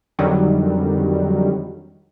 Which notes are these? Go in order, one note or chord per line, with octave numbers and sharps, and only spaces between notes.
F2 D3 D#3 F#3 G3